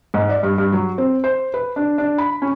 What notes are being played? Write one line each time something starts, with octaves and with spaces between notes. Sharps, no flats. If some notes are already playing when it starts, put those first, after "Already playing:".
G#2
D5
G2
G2
F#3
C4
C5
B4
D4
D4
B5
C#4